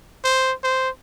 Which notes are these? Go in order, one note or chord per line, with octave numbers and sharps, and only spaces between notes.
C5
C5